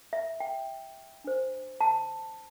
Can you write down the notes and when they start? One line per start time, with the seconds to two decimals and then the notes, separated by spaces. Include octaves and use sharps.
0.13 E5
0.40 G5
1.24 D4 C5
1.81 A5